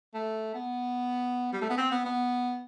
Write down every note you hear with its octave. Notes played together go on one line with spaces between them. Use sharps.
A3
B3
G3
A3
B3
C4
B3
B3